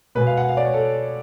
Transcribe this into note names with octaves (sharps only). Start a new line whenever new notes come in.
B2 G#3 B4
F5
F#5
F5
D5
C#5
A4